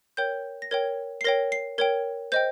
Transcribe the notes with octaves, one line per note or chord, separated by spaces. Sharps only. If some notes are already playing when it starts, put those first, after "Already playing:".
A#4 C#5 G5 G6
A#6
A#4 C#5 G5 G#6
C7
A#4 C#5 G5 A#6
C7
A#4 C#5 G5 G#6
C5 D#5 G5 G6